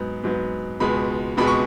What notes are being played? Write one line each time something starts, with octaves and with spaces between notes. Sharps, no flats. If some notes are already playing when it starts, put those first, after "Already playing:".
Already playing: G#2 F#3 B3
G#2 F#3 B3
C#2 B2 G#3 B5
C#2 B2 G#3 B5
C#6